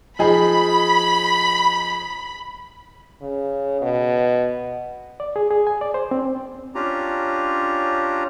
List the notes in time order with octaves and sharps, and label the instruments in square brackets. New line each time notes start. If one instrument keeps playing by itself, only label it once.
[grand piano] F3 D#4 G#4 [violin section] B5
[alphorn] C#3
B2
[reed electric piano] D5
G#4
G#4
G#5
D5
C5
C4
[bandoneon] C#4 D4 F4 G4 A#5